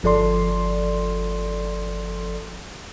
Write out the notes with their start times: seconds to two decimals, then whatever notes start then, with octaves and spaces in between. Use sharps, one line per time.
0.03 G1 F3 A4 D5 C6